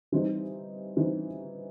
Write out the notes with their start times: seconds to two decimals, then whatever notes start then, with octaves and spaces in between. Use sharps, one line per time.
0.12 E3 G3 C4 D#4
0.97 E3 G3 C4 D#4